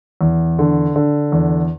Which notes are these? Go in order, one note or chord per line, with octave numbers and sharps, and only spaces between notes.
E2
D3
D3
E2